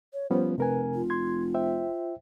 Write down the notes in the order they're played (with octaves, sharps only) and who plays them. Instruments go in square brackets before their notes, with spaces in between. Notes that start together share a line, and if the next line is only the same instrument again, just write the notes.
[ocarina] C#5
[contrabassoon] F3 [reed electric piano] G3 B3 C#4 [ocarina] C5
[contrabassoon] F1 [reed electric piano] C3 A#4 G#5 [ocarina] B4
[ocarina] F4
[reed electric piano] C6 G#6
C5 E5 G5